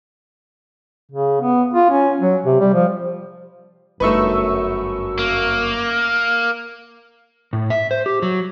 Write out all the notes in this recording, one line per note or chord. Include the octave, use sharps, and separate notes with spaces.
C#3
B3
F4
C#4
F#3
C3
G3
F3
G1 F#2 A3 D#4 B4 C#6 E6
A#3
A2
E5
C5
G4
F#3